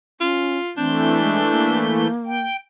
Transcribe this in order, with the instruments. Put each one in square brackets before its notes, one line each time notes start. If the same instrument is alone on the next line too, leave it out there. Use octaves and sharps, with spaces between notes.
[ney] C#4 [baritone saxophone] F4
[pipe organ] E3 A3 G6 [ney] C4 [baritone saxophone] D4
[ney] G#3
A#3
[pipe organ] G5